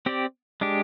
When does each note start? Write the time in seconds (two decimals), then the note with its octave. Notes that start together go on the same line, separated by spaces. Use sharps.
0.06 C4 G4 D5
0.61 G#3 D4 G4